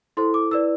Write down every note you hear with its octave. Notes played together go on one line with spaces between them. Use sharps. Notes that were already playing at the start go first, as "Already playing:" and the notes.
E4 A4 C5 C6
D6
E4 B4 D5 E6